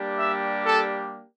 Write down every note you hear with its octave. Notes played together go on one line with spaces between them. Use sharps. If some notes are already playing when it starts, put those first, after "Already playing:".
Already playing: G3 A#3 D4 G4
E5
A4